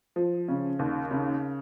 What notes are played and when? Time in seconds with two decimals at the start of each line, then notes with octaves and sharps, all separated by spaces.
0.16 F3
0.48 C#3
0.79 D#2
1.11 C#3